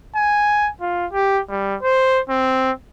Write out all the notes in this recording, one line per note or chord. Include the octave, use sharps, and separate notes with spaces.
G#5
F4
G4
G3
C5
C4